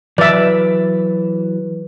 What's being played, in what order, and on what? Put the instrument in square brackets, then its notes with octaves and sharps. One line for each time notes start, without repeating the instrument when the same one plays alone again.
[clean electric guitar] E3 F#3 [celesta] B4 [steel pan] D5 E5